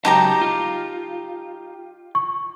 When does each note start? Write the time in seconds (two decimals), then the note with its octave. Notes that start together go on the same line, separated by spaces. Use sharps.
0.05 C#2 F#3 D#4 G4 A5 A#5
0.41 F4
2.15 C#6